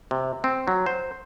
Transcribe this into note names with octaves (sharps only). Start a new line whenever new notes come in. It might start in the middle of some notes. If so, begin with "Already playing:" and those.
C3
C4
F#3
C5